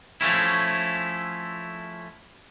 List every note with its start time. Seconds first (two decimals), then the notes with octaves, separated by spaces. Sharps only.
0.21 F3 A3 C#4 E4